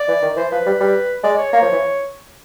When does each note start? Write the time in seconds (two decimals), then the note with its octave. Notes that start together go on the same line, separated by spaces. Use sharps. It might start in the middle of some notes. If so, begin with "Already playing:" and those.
Already playing: D5
0.08 E3
0.22 D#3
0.36 E3 C5
0.52 F3 B4
0.66 G3
0.80 G3
1.24 G#3 D5
1.38 C#5
1.53 A#3 C#5
1.62 F3
1.72 E3